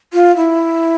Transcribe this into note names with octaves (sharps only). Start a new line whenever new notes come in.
F4
E4